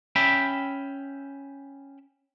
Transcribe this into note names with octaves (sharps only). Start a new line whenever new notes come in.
C#4 E5 G5 B5